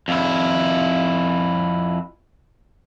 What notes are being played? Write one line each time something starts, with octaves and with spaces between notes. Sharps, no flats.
F2 E4